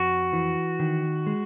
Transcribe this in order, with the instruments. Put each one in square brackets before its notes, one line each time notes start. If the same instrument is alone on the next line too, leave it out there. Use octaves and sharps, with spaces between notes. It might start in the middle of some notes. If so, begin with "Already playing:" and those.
Already playing: [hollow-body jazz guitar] F2 [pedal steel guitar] F#4
[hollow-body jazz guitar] E3
D#3
G#3